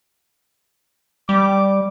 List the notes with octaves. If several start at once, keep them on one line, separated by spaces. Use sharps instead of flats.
G3 D6